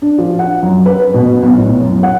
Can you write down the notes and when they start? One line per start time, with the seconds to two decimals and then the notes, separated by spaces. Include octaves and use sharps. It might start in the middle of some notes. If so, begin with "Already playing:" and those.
0.02 D4
0.18 F3
0.39 F#5
0.63 F#2
0.86 B4
1.14 B2
1.43 B1
1.57 A2
1.80 F#2
2.03 F#5